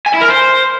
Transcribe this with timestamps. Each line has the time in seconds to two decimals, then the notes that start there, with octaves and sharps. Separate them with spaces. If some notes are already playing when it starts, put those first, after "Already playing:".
0.06 G#5
0.14 E4
0.21 A#4
0.29 C5